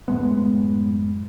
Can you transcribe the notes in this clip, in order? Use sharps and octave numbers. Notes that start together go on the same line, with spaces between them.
F#2 A2 G#3 B3